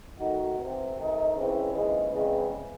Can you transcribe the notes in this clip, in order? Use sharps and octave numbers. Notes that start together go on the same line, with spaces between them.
D#3 A3 D#4 F#4
C3 E3 C4
C3 D#3 A3 D#4
C#2 C#3 E3 C4 E4
D#2 C#3 E3 G#3
E2 C#3 E3 G#3 C4